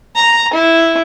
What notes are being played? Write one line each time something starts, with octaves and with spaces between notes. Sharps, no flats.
A#5
E4